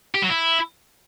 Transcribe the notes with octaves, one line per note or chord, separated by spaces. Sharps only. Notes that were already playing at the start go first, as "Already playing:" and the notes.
G4
F#3
E4